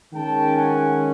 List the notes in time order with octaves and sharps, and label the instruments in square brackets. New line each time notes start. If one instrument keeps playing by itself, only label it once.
[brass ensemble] D#3 G#3 C#4 G5 A5
F#5 G#5